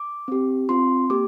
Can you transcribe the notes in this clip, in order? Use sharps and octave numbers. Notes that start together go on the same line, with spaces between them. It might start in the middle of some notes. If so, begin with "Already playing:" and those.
Already playing: D6
C4 G4
C4 F4 C6
A#3 G4 D6